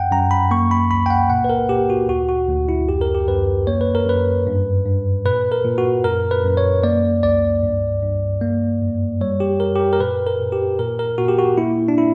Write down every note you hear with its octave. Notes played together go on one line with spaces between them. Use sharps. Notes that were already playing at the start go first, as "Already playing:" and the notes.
Already playing: F#2 F#5 G5
F#2 A#5
B5
A#3 C#6
B5
C#2 B5
G5
F#5
A#2 F#5
B4
A#4
A#2 G4
F#4
D2 F#4
F#4
D2
E4
F#2 G4
A#4
G4
F#2 B4
A#3 C#5
B4
A#4
F#2 B4
G2
G2
A#2 B4
A#4
A#2
F#4
F#2 A#4
B4
F#2
C#5
A#3 D5
C#2 D5
G2
G2
A#3
F#2
G3 C#5
G4
F#2 A#4
G4
A#4
A#4
A#2 B4
A#4
A#2
G4
A#2 A#4
A#4
A#2 F#4
G4
F#4
A#3 E4
D4
E4